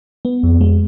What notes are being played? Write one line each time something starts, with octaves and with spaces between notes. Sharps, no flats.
B3
F2
G#3